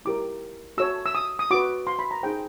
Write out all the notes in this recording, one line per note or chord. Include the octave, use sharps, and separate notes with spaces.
E4 G4 A#4 D6
F#4 A4 C#5 E6
E6
D#6
D#6
F#4 B4 D6
C6
B5
A#5
D#4 G#4 C5 G5